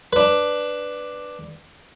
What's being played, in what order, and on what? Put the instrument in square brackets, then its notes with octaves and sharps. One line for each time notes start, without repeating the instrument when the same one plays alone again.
[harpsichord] D4 B4